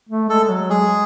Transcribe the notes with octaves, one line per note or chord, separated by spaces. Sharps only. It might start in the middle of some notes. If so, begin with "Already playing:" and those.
A3
G#3 A4
F#3
G#3 G#4